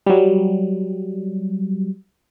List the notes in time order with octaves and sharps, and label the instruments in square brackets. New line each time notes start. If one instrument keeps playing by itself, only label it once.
[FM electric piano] F#3 G3